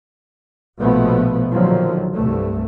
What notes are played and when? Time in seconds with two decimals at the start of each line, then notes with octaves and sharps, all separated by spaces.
0.78 A#1 B2 F3 A3 B3
1.51 A#1 D3 D#3 F3 F#3
2.12 C2 G2 A3